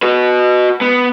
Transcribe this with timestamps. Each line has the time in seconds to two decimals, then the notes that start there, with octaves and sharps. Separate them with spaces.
0.03 F#4 B4
0.81 B3